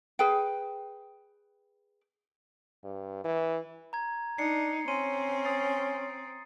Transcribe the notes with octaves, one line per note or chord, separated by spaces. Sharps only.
G#4 B4 G5
G2
E3
A#5 G#6
D4 D#4 C7 C#7
C4 C#4 C6 D#7
D#6 A6 C7